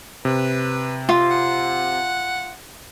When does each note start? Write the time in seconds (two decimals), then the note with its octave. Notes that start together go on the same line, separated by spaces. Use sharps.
0.25 C3 B4
1.09 F4
1.31 F#5